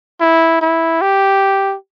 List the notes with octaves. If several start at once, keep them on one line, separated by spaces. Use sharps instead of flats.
E4
E4
G4